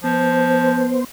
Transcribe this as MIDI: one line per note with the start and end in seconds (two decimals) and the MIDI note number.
0.04 0.92 53
0.04 1.04 59
0.04 1.04 72